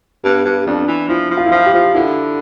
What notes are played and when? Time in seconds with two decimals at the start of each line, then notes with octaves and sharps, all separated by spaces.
0.24 G2 B3
0.46 G2
0.67 F2 D4
0.88 E3
1.09 F3 E4
1.31 F3
1.37 F4
1.46 E4
1.52 F3 F4
1.66 G4
1.74 F3
1.95 D3 E4